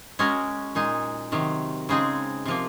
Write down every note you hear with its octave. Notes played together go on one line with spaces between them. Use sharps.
G#3 C#4 F#4 A#4
A#2 G#3 D#4
C3 D#3 F#3
C#3 G#3 C4 D#4 G#4
C3 F3 A#3